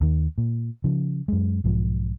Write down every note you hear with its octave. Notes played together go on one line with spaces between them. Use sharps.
D#2 D#3
A#2
C#3 F3
F#2 G#3
B1 G#2 F3